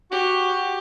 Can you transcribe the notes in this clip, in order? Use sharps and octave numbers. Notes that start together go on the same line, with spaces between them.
F#4 G4